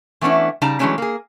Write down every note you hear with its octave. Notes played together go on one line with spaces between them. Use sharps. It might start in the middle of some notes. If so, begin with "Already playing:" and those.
E3 A3 B3 C#4 D4 E4
C#3 G3 D#4 D5 A5 A#5
E3 F#3 G#3 A3 C#4 D4
A#3 G#4